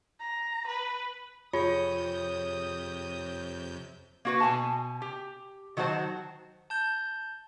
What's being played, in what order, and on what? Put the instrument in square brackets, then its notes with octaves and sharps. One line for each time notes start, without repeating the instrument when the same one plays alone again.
[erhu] A#5
B4
[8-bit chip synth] F2 C3 G6 [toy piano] F4 [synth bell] G#4 C#5 [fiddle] D#6
[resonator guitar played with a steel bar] A#3 F#4 B4
B2 G4 G#5 A5
G4
D#3 F#3 F#4 A4 C5 A5
[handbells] A5 G6